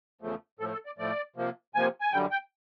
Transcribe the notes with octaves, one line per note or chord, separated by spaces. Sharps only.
E2 C#3 F3 A3
A2 F3 A3 A4
A4
D5
A2 F3 A3 D5
C3 F3 A#3
C3 F3 A#3 G#5
G#5
F#2 D3 G3 G5
G5